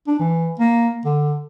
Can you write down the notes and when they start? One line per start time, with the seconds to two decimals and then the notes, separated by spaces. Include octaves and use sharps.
0.07 D4
0.19 E3
0.59 A#3
1.05 D3